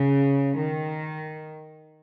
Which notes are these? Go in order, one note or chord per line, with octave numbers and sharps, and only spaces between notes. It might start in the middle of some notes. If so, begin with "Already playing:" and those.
Already playing: C#3
D#3